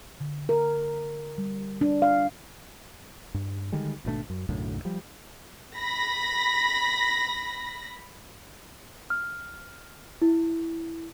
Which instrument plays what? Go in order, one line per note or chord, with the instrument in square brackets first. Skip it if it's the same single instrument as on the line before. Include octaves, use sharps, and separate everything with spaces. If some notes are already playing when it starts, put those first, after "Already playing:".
[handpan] D3
A#4
G3
D4
F5
[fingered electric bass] G2
D3 D#3 G3 G#3
G#1 B2 A3 D4
F#2
B1 F#2 A2 D3
F3 G3
[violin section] B5 A#6
[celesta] F6
E4